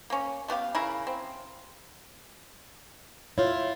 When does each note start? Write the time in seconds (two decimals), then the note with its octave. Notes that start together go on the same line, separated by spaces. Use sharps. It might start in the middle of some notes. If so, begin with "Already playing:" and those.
0.10 A#3 C#4
0.48 A3 B3 G4 F5
0.75 C#3 E4 A#4
1.07 C4
3.38 E4 F4 C#5